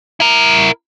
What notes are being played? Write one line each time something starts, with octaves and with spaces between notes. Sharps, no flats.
E4 A#4